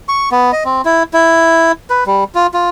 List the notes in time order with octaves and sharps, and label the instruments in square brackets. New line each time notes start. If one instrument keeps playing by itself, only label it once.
[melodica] C#6
B3
D#5
C4
E4
E4
B4
G3
F4
F4